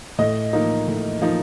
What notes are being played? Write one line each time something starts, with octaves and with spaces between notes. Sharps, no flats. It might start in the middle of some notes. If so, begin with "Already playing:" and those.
A2 D#5
F3 A#3 D#4
A2
F3 A#3 D#4